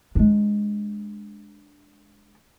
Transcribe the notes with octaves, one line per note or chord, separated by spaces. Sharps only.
G#3 D4